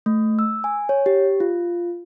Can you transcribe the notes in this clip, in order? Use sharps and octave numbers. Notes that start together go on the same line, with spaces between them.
A3
E6
G#5
C#5
G4
F4